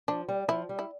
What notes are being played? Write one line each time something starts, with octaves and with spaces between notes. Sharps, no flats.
F3 D4
G3
F3 E4
G3
E4